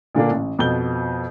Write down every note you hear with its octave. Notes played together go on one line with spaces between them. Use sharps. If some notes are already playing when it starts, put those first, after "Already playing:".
A#2 D3 A#3 D4
A1
F2 B2 G6 G7